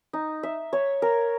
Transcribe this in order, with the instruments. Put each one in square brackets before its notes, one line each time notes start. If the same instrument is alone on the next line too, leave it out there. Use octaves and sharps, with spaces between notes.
[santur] D#4
E5
C#5
A#4